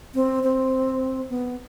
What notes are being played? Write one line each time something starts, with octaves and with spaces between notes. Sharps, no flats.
C4
C4
B3